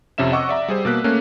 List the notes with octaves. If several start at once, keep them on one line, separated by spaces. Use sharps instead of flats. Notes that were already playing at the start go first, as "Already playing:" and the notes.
F2 C3 C#4 E5 E7
D#5 F#5 C#6 D6 E6
D5 E5 A#5
G3 G#4 C5
B2 A#3 F#6 B6
A3 A#3 C#4